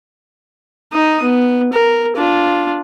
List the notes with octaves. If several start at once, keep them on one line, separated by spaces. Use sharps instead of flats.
D#4 D#6
B3
A#4
D4 F4